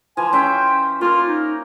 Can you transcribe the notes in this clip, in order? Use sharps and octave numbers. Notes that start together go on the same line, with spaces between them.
E3 F3 G#5
C#4 C5 E5 G5
A#3 F4 A#4
D#4